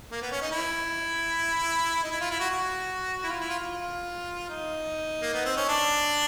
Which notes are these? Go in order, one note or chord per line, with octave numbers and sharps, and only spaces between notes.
A#3
B3
C#4
D#4
E4
D#4
E4
F4
E4
F#4
F#4
E4
F4
E4
F4
F4
D#4
A#3
B3
C4
C#4
D4